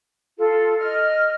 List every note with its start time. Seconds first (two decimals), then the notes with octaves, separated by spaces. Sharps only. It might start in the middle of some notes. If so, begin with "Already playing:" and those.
0.38 F4 A4
0.79 D#5 F6